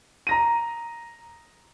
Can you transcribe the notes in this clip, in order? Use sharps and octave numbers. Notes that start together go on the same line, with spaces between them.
A#5 A#6 D#7